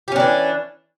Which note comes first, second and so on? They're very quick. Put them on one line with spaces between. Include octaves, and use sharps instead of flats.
G4 C#4 D4 E3